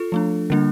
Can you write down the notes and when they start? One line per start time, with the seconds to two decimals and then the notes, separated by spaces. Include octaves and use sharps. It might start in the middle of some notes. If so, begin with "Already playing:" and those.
Already playing: F4 A4
0.12 F3 A3 D4
0.50 D3 G3 A#3 D4